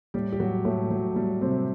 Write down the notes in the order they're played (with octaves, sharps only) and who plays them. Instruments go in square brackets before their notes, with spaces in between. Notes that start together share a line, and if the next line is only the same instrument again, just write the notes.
[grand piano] A2 G3 G4
G4
A2 F#3 F#4
A2 A3
A2 F#3
A2 G3
A2 C3 C4